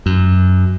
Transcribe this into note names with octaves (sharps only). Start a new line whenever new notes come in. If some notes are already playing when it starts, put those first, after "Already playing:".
F#2